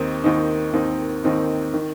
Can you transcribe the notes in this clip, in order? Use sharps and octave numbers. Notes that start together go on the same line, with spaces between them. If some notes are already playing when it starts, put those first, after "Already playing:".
Already playing: D#2 D#3 C4 D#4
D#2 D#3 C4 D#4
D#2 D#3 C4 D#4
D#2 D#3 C4 D#4
D#3